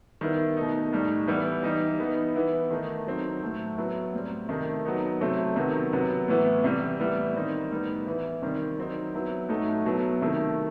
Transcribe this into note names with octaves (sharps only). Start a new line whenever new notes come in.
D#3 G3 B3 E4
B2 A3 D#4
A2 G3 D#4
E3 G3 B3 E4
E3 G3 D#4
E3 B3 D#4
E3 B3 E4
D#3 A3 D#4
F#3 C4 D#4
A2 F#3 A3
F#3 B3 E4
A2 G3 C4
C3 D#3 A3 D#4
F#3 B3 D#4
C3 F#3 A3 C4
C3 D#3 F#3 B3
C3 F#3 B3
A2 E3 B3 E4
C3 E3 G3
A2 E3 G3 B3 E4
D#3 G3 C4 D#4
A2 G3 B3 D#4
E3 B3 E4
C3 D#3 G3 C4
F#3 C4 D#4
F#3 B3 E4
A2 F#3 A3 D#4
B2 F#3 B3 E4
C3 D#3 A3 E4